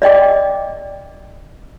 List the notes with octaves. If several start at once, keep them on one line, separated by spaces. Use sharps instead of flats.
D5 D#5 G5 D6